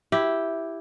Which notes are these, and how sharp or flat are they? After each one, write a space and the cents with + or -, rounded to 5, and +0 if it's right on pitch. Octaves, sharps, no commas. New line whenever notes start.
E4 +0 G4 +0